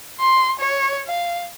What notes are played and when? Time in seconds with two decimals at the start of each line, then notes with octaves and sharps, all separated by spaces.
0.20 C6
0.59 C#5
1.06 F5